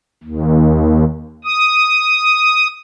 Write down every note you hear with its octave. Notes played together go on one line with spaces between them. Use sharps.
D#2
D#6